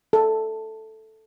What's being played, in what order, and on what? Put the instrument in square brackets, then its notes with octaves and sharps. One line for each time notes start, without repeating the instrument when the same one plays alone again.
[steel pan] A4